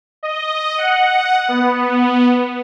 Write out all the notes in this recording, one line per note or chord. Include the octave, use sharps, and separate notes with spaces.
D#5
F#5
B3